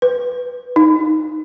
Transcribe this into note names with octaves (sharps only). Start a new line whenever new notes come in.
B4
D#4